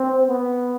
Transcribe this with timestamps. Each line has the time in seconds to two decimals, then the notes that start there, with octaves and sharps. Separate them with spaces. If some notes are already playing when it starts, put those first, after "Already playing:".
Already playing: C4
0.27 B3